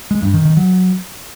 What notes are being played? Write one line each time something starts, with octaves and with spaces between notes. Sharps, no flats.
G#3
G2
D#3
D#3
F#3